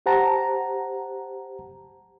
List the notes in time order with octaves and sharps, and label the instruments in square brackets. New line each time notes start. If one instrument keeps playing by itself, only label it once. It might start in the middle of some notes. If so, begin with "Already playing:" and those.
[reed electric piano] G4 C5 F#5 A5 A#5